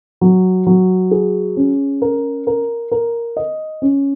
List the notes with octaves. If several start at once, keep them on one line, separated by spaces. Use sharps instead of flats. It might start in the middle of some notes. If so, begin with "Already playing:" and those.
F#3
F#3
G#4
C#4
A#4
A#4
A#4
D#5
C#4